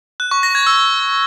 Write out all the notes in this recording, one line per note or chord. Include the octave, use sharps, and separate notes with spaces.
F#6
C#6
A#6
G#6
E6